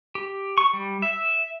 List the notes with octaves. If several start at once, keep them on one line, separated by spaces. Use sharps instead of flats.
G4
C#6
G3
E5